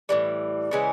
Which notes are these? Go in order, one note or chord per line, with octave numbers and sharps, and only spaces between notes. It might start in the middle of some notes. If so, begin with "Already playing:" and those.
A2 E3 G3
C#3 E3 G#3 C#4